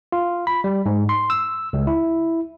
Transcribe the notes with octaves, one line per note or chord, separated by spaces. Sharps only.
F4
B5
G3
G#2
C6
E6
C#2
E4